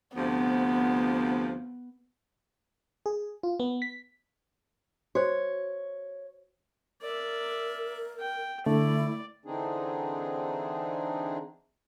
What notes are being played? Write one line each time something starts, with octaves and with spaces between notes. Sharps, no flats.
D2 C3 F3 B3
G#4
F4
B3
B6
F#4 C5 C#5
A#4 D5 E5
G5
D3 A3 E4 D5
D3 E3 C4 D4 D#4 G#4